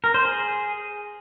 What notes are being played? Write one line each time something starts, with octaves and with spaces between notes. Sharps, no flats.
A#4
C5
G#4